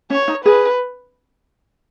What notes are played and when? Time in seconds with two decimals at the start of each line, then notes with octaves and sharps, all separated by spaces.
0.10 C#4 C#5
0.28 D#4
0.45 G#4 B4